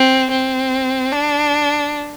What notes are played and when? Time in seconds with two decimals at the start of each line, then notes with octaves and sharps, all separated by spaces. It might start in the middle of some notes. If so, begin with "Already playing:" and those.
Already playing: C4
0.30 C4
1.12 D4